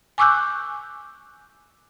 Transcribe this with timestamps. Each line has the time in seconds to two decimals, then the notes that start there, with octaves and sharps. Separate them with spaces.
0.18 G#5 C#6 D6 E6 F#6 G6